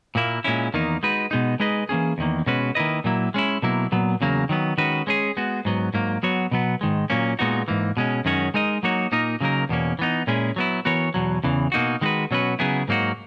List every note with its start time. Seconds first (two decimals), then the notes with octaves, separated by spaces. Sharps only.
0.15 A#2 A#3 E4
0.44 A#2 G#3 C#4 E4
0.74 E2 D#3 A#3 D#4
1.03 G#3 D#4 F#4 B4
1.31 B2 G#3 B3 D#4
1.60 G#3 D#4 G#4 B4 D#5
1.89 E3 A#3 C#4 G#4
2.18 E2 D#3 A#3
2.46 B2 G#3 C#4 F#4 B4
2.75 D#3 A#3 E4 B4 D#5
3.04 A#2 F#3 A#3 E4
3.34 G#3 C#4 E4
3.62 B2 F#3 A#3 E4
3.92 A#2 F#3 B3
4.21 E2 C#3 F#3 A#3
4.49 D#3 F#3 B3
4.78 D#3 G#3 C#4 F#4 B4
5.07 G#3 C#4 G#4
5.37 G#3 B3 F#4
5.65 G#2 F#3 B3
5.94 G#2 F#3 A#3
6.23 F#3 B3 F#4 C#5
6.51 B2 F#3 B3
6.81 G#2 D#3 G#3
7.10 A#2 F#3 A#3 C#4
7.39 A#2 G#3 B3 D#4 F#4
7.68 G#2 E3 A#3
7.97 B2 G#3 C#4
8.25 F#2 D#3 G#3 C#4 F#4
8.54 G#3 D#4 A#4 D#5
8.83 F#3 A#3 D#4 F#4 C#5
9.12 A#2 A#3 D#4 A#4 D#5
9.41 C#3 F#3 A#3 D#4 A#4
9.69 E2 B2 A#3 C#4
9.99 E3 B3 D#4
10.27 A#2 G#3 C#4 E4 G#4
10.56 F#3 B3 E4
10.85 E3 B3 F#4 A#4 C#5
11.14 E2 B2 F#3
11.44 E2 C#3 E3
11.72 B2 A#3 D#4 F#4
12.01 D#3 G#3 D#4 F#4 B4
12.31 B2 F#3 C#4 F#4 B4
12.59 C#3 F#3 B3 E4 G#4
12.88 G#2 F#3 A#3 D#4 F#4